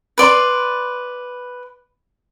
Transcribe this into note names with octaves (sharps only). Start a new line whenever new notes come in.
B4 D5 C6